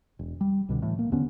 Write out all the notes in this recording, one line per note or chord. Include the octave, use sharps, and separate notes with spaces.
E1
G3
C2 B2 D3
A2 E3
A#3
D#2 D3 B3 C#4